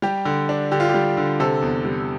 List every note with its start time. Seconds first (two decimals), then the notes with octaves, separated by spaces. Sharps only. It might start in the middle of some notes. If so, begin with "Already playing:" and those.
0.02 G3 G4
0.25 D3
0.49 D4
0.72 D3 G4
0.80 F4
0.89 G4
0.94 G3
1.17 D3
1.40 C3 A4
1.62 E2
1.85 G3